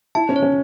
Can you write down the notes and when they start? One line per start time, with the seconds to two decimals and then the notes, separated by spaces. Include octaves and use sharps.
0.15 E4 A5
0.29 C#4
0.36 C#5
0.43 C#4